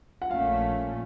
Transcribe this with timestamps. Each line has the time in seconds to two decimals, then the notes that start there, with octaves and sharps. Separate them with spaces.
0.22 F#5
0.30 A#1 A#2 A3 C#4 F5